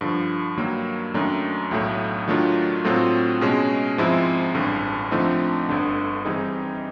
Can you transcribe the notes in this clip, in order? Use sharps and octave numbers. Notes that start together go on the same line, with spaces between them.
G2 D3 F3
G2 D#3 F#3 A#3
F#2 D#3 F#3 A3 D4
B1 A2 F#3 A3
D#3 F#3 A3 D4 F4
A2 F#3 A3 C4 F4
B2 G#3 C#4
G#2 F3 G#3 C4 E4
A1 G2 D3
D3 F3 A3 C4 D#4
G1 G2 D3
E3 G3 C4 D#4 G#4